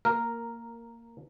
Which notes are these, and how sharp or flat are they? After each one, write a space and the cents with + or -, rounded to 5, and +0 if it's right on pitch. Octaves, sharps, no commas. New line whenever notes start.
A#3 -10 A#4 +0